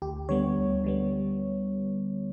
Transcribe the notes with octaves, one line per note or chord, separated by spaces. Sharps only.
D2 G4
D3 G3 B3 C#5
D2
D3 G3 B3